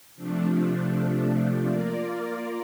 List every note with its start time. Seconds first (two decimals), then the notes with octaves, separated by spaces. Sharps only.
0.16 C3 F3 A3 D4
1.66 A#3 F4 A#4 D5